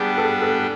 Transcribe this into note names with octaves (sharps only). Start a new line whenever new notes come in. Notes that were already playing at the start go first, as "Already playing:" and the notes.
Already playing: G3 B3 D4 G4 G#4
A4
A4